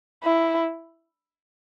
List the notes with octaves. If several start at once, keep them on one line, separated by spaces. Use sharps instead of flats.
E4